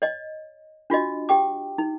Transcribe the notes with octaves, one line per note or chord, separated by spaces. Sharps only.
C#5 D#5
D4 F4 F#4 D#5
G4 G5 D6
D#4